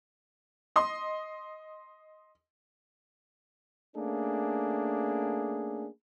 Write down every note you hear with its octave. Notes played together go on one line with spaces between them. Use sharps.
D#5 C6
A3 A#3 C#4 D4 G#4